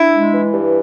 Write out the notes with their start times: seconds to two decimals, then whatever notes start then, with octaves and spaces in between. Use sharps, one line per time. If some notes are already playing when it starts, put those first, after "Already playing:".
Already playing: D4 E4
0.11 G#3
0.32 E3
0.53 G2